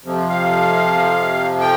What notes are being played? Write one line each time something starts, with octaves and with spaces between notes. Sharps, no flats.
F2 C3 F3
F5
G5